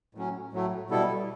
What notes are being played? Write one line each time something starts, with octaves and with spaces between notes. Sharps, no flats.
A2 F#3 C#4
A2 F#3 A3
B2 G3 B3 E4 A4